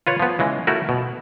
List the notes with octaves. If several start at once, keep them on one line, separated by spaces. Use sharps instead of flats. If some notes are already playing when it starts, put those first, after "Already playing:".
F4 B4 C#5
F3 B3
C#3 E3 G#3
A3 E4 F#4 A#4
B2